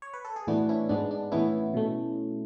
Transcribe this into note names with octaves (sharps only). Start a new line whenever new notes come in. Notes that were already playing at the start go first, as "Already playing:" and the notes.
C#5
B4
A4
G#4
A2 E3 B3 D4 F#4
C#4 E4
G#2 G#3 B3 D4
D4
A2 E3 B3 C#4 E4
B2 A3